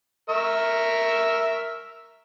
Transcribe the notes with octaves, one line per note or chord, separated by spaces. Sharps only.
A#4 E5 C#6